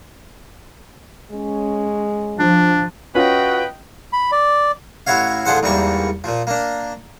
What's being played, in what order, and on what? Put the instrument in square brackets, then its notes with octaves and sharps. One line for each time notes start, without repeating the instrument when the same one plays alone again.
[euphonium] G#3 [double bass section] C#4
[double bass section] F3 [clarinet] D4
[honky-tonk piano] C#4 F4 [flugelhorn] F#4 [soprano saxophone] B4 [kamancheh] D#5 G5
[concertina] B5
D5
[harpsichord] A1 E4 F#4 C#5 F5
A1 D3 F3 G#4 C5 F#5
E2 G#2 G3 A#3 C#6
A#2 F3
A#3 D4